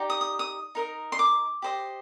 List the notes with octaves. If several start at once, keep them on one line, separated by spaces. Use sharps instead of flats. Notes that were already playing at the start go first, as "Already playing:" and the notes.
Already playing: D#4 G4 D5
D#6
D#6
D#6
D#4 A#4 D#5
C6
D6
G4 C5 D#5